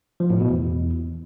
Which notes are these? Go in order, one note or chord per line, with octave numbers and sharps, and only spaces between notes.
F3
A2
B2
E2